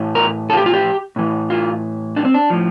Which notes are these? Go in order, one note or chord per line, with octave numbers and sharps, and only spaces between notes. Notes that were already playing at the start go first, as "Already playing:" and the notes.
Already playing: A2 E3
A#4
A4
F4
G4
F4
G4
A2 E3
F4
D4
C4
D4
A2 F3